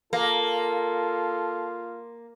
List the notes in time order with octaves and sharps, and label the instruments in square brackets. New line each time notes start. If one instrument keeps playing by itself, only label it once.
[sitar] A#3 [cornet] F4 [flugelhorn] A4